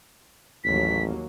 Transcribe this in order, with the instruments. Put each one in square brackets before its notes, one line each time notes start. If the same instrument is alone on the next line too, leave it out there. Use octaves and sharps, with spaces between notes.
[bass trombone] A1 [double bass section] D#2 F#3 A#3 [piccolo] B6